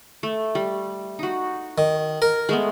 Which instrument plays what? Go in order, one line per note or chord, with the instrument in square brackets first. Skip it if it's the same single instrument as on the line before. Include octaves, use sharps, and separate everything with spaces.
[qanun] A3
G3
D#4 F#4
[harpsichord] D#3
A#4
[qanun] G#3 A3 B3